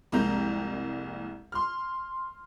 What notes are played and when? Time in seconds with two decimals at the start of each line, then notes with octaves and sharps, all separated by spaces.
0.12 C2 F2 G#3 A#3 A#5 G6
1.52 C6 F6